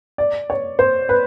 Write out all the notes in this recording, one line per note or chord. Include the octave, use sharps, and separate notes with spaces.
D5
C#5
C5
B4